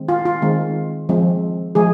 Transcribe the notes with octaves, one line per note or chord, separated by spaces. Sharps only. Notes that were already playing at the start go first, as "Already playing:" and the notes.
Already playing: D#3 G#3 C4
F4
F4
D#3 G#3 C4
F3 G#3 C4
F3 G#3 G#4